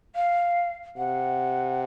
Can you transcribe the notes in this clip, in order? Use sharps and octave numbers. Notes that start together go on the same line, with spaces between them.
F5
C3 F#5